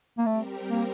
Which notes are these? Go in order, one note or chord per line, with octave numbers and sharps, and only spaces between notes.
A#3
G3 A3 C4 G4 A#4
A#3